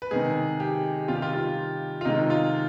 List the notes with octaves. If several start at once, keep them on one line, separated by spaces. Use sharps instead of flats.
B4
C3 D#3 G#3 G#4
G4
C3 D#3 G3 F4
G4
F4
F4
F4
C3 D#3 G#3 D#4
F4